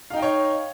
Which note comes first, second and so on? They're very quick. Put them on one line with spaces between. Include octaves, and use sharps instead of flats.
F5 D#4 G5 D#5 C#5